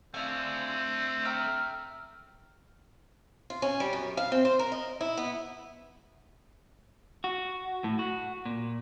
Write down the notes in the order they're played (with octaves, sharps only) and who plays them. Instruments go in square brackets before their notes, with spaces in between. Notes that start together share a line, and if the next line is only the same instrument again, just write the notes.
[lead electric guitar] A3 D4 [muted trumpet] C4 [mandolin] F4 E5 G#5
[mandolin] E5 G5 A#5 [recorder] F6
[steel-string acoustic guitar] F4
C#4
G3
F#2
F5
C4
C5
A#4
D#5
E4
B3
[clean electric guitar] F#4
A2
F#4
A#2